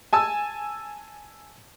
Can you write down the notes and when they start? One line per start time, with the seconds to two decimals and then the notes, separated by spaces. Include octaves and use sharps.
0.13 G#5 A5 E6